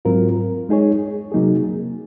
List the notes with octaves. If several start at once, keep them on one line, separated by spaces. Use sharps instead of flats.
G#2 F#3 C4 F4 A#4
G#3 D#4 G#4 C#5
C3 F#3 A#3 D#4 G#4